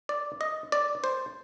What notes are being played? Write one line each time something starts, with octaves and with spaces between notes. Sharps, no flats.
D5
D#5
D5
C5